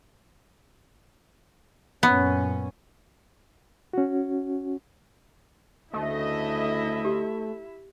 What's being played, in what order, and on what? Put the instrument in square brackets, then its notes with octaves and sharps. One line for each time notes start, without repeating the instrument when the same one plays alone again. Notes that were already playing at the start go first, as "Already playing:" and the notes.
[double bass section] F#2 A#2 C#4 [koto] B3
[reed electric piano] C#4 F#4
[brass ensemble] D2 C#3 D#5 [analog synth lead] A3 [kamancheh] E4 E5
[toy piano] G4